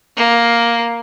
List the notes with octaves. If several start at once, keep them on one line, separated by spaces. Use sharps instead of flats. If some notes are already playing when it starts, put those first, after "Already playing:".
A#3